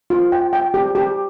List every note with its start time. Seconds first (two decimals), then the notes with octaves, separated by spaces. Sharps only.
0.10 F4
0.32 G5
0.53 G5
0.74 G4
0.95 G4